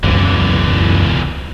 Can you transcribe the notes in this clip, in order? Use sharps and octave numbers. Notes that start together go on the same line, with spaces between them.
E1 C#2 F#2 D3 E3